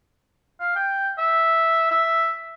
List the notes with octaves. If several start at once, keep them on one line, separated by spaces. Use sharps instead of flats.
F5
G5
E5
E5